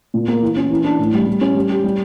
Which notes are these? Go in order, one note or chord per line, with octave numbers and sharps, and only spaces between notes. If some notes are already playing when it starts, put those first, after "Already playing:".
A#2
A#3
E3
C#4
E3
D4
A2
G3
G3
C#4
G3
G4
G3